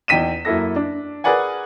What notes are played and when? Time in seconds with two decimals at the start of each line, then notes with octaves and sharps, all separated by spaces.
0.08 E2 D#4 G5 B6 D#7 E7
0.45 F#2 A#3 E4 A4 A#6
0.76 D4
1.24 G#4 A#4 B4 D5 F#5 G#5